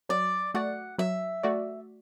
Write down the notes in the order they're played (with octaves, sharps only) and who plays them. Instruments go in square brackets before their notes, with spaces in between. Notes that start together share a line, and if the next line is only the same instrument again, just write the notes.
[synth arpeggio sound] F#3 [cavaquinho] D5
[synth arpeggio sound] A3 F#4 D5 [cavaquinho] F#5
[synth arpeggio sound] F#3 [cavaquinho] E5
[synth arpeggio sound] A3 F#4 D5